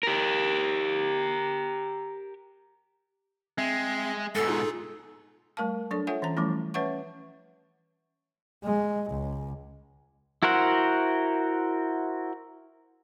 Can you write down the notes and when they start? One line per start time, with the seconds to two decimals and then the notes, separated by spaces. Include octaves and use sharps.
0.03 G4 A#4
3.58 G#3 C4 E5
4.35 G#2 B2 A4 A6 C#7
4.48 D#4 F4 G#4
5.57 G3 A3 A#4 F5 A5
5.91 F#3 D4 A4 D5
6.07 F4 A4 C#5 E5 F#5 G#5
6.22 E3 C#4 A#5
6.37 E3 F3 G3 A3 C#4 E4
6.74 C#4 B4 C#5 E5 F#5 C#6
8.64 G#3
9.10 C#2
10.43 E4 F#4 A#4 C5 F#5